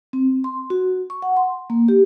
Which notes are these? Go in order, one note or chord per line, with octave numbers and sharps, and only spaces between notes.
C4
C6
F#4
C#6
F#5
C6
A#3
G4